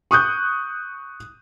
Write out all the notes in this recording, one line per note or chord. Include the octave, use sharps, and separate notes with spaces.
C#6 D#6 F#6 G6